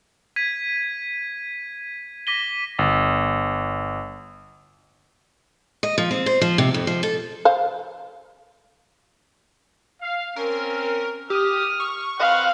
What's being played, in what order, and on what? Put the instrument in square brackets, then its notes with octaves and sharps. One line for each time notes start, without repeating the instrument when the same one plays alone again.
[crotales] G#6 B6 D#7
D6 A#6 B6 D#7 G7
[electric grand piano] G1
[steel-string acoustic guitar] D#5
F3
C4
C5
F3
C3
F2
F3
A4
[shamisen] C5 F5
[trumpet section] F5
[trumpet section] C4 C#4 [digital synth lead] A#4
[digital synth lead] G4 [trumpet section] D#6 [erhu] F6
[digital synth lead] C#6
[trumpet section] C4 B4 F#5 [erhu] F5